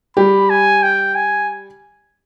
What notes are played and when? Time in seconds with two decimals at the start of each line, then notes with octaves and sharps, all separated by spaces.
0.17 G3 G4 B5
0.50 G#5
0.83 G5
1.15 G#5